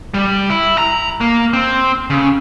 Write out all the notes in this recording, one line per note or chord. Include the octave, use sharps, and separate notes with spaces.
G3
E4
A#5
A#3
C4
C#3